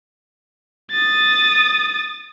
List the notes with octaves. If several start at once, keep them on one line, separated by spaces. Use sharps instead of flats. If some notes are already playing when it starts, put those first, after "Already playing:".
D#6 A6